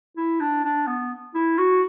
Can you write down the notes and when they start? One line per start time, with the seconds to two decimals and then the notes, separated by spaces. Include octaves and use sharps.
0.17 E4
0.40 D4
0.64 D4
0.87 B3
1.35 E4
1.58 F#4